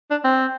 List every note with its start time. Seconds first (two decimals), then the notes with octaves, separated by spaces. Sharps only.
0.10 D4
0.24 C4